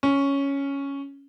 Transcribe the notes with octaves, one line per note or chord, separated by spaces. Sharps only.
C#4